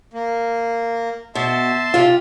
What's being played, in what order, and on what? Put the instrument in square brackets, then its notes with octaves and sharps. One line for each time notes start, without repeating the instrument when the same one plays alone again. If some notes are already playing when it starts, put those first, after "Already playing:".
[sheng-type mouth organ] A#3
[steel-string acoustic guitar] B2 [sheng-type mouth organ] E5 A5 C6
[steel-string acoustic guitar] C3 F4